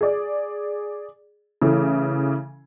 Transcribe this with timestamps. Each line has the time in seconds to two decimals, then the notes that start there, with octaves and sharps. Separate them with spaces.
0.01 G#4 D5
1.62 C#3 E3 A3